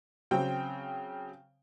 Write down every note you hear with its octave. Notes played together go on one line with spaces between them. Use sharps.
C#3 F#3 C4 G5